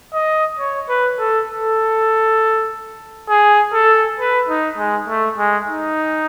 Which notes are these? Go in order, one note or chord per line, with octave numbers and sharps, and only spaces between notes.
D#5
C#5
B4
A4
A4
G#4
A4
B4
D#4
G#3
A3
G#3
D#4